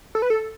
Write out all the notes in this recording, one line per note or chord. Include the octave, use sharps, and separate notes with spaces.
A4
B4
A4